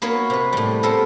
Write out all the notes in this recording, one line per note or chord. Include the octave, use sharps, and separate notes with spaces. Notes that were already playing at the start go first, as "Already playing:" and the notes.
A#3 B3 F#4 A#4 C#5
C3 B4
A2 G3
B3 C4 A4 A#4